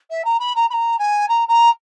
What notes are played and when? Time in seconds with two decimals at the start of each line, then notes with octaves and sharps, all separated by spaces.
0.10 E5
0.25 A#5
0.40 B5
0.56 A#5
0.70 B5
0.73 A#5
0.99 G#5
1.28 A#5
1.48 A#5